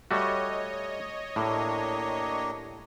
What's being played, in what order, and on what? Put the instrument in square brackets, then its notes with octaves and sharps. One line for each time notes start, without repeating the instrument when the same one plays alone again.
[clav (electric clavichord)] G3 A3 F#4 [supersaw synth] C#5 D#5
[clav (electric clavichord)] A2 [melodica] A#3 D4 G4